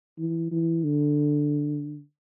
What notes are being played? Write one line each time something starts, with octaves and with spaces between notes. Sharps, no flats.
E3
E3
D3